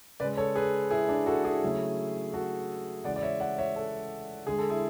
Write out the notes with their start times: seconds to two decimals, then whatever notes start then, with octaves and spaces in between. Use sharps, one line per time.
0.20 C#3 B4 D5
0.24 G#3
0.37 A4 C#5
0.56 G#4 B4
0.91 E4 G#4
1.09 D4
1.26 F#4 A4
1.44 E4 G#4
1.62 C#3 F#3 A3
2.33 F#4 A4
3.04 C#3 E3 G#3 D5 F#5
3.16 D5
3.23 C#5 E5
3.40 D5 F#5
3.58 C#5 E5
3.76 A4 C#5
4.47 D3 G#3 G#4
4.58 A4
4.70 E4 G#4